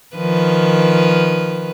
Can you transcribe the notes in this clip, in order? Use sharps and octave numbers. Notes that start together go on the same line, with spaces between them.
D#3 F3 B4